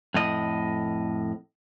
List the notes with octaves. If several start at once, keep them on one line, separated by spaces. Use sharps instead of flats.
F2 A2 D#5